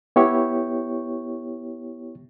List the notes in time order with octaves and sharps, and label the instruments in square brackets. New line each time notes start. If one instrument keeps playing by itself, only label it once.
[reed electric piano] B3 E4 G4 C#5 G5 C#6